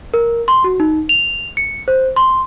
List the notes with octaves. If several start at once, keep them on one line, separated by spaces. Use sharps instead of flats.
A#4
C6
F#4
D#4
F7
C#7
C5
C6